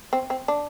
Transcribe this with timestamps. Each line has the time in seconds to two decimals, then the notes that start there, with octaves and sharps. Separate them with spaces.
0.13 C4
0.30 C4
0.48 D4